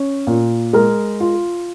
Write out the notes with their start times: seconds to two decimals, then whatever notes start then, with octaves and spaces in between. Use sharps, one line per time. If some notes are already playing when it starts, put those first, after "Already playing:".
Already playing: C#4
0.27 A#2
0.73 G#3 A#4
1.20 F4